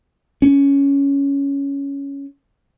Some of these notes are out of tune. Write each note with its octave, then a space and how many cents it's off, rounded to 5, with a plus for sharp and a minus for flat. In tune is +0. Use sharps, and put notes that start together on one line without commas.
C#4 +10